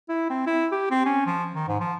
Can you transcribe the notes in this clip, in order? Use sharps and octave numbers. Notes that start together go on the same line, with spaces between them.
E4
C4
E4
G4
C4
C#4
F3
D#3
G#2
F3